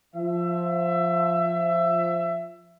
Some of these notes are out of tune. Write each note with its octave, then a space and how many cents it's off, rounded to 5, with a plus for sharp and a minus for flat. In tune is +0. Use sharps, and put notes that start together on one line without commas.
F3 +0 E5 +20